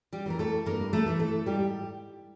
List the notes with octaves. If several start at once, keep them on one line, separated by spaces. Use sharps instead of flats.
G3 G4
E3 A3 A#4
A3 A4
G2 A#3 A#4
A3 A4
E3 A3
A3 A4
G#2 G3 G4